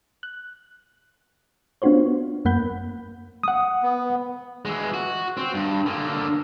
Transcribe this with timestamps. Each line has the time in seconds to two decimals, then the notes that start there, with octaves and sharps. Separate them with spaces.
0.23 F#6
1.82 B3 D4 F4 F#4 C5 C#5
2.45 F#2 A#3 F#5 B5 G6
3.43 F#5 D#6
3.83 B3
4.65 E3 G#3
4.94 F#4
5.37 C4
5.55 G2
5.86 D3 A#3